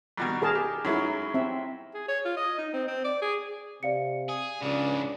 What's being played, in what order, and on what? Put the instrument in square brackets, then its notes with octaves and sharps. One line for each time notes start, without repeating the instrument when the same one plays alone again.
[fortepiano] G2 B2 D#3
[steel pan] G#4 A#4 A5
[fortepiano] G4
[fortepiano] F#2 F#3 G#3 [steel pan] D#4 E4 A#4
[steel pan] C4 E5
[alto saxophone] G#4
C#5
F4
D#5
D#4
C4
C4
D5
G#4
[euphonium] C3 [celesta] D5 F5 C#7
[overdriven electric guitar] G#4
[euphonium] C#2 [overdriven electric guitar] G#2 C#3 [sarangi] D4